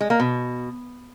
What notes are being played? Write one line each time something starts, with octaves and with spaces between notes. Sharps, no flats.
G#3
A#3
B2